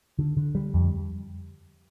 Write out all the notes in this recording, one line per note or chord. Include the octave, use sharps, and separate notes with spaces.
D3
D3
G3
F2